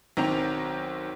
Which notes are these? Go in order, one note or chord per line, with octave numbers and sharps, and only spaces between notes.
B1 D#3 C4 G5 A#5 F7